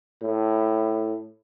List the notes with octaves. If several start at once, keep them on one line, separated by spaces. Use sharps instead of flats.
A2